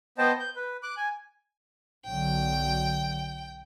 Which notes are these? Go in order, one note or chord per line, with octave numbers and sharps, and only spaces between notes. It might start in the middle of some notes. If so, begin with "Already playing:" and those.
B3 C5 D#5 G5 A5
G6
B4
D6 F#6
G#5
B1 D3 F#3 G5